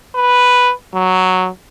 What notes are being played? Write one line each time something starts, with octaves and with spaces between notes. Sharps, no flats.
B4
F#3